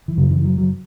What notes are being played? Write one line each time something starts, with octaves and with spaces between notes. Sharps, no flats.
E3
F#2 C#3 F#3
E3
F#3
F#3